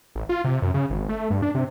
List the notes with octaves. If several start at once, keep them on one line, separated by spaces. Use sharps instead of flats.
A1
F4
C3
F#2
C#3
G#1
A3
G2
D4
C3